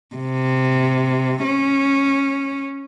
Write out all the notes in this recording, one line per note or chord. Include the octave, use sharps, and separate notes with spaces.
C3
C#4